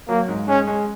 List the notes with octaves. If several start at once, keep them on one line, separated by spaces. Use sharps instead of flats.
F#3 A#3
G#2
G#3 C#4
G#3